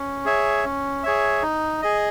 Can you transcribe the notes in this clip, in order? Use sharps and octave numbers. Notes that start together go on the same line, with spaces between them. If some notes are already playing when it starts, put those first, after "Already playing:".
Already playing: C#4
G#4 C#5 E5
C#4
G#4 C#5 E5
D#4
G#4 D#5